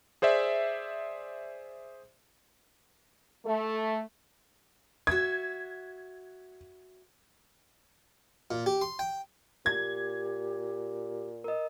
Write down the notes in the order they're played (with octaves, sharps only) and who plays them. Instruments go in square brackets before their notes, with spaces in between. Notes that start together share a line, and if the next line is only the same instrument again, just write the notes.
[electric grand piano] G#4 C5 D5 E5
[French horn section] A3
[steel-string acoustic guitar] F#4 E5 [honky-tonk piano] G#6
[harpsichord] A#2
G4
C6
G5
[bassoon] A#2 [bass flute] G4 [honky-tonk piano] G#6
[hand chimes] A#4 D#5